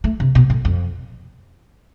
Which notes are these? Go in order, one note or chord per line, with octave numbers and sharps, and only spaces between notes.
A3
C3
B2
A2
F2